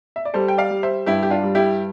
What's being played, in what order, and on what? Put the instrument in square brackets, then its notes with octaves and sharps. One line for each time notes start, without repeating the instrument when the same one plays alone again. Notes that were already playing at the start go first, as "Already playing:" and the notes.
[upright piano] E5
D5
[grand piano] G3 [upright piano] A4 C5
[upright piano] G5
D5 F5
[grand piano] G3
[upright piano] C5 E5
[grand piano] G2 [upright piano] E4 G4
[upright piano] G4
D4 F4
[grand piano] G3
[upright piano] E4 G4